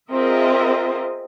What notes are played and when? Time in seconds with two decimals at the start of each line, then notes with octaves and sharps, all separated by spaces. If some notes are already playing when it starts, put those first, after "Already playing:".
0.10 C4 F4 G#4 A#4 D#5 E5